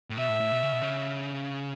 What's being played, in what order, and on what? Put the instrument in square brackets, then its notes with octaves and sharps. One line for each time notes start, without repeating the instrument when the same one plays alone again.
[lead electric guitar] A2
[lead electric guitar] B2 [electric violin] E5
[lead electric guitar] A2
A2
B2
C#3
B2
C#3